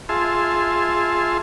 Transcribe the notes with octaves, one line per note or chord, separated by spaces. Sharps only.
F4 G#4 E5 A5 C6